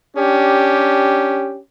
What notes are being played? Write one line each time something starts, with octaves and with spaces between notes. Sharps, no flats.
C#4 D4 G4